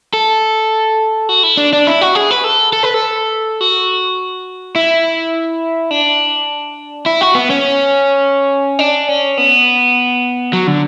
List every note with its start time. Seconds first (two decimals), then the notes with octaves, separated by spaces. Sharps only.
0.13 A4
1.29 F#4
1.43 E4
1.57 D4
1.73 D4
1.87 E4
2.01 F#4
2.15 G#4
2.31 B4
2.44 A4
2.73 A4
2.83 B4
2.94 A4
3.61 F#4
4.76 E4
5.91 D4
7.06 E4
7.21 F#4
7.35 B3
7.50 C#4
8.79 D4
9.08 C#4
9.37 B3
10.53 F#3
10.67 D3